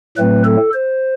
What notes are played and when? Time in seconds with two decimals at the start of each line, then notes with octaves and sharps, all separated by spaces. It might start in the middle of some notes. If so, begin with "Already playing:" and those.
0.17 A2 F#3 A3 C4 B4
0.45 A4
0.73 C5